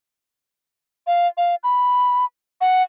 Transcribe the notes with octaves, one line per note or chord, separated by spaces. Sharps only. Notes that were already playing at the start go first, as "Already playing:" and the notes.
F5
F5
B5
F#5